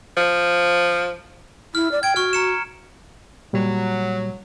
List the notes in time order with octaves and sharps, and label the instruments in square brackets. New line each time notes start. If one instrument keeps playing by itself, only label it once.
[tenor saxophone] F3
[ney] E4 [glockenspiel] F6
[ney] D5
[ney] G5 [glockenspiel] G#6 D7
[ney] F#4 [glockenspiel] C#6 F6
[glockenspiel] A#5 C#7 E7
[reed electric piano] A#2 G3 [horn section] F#3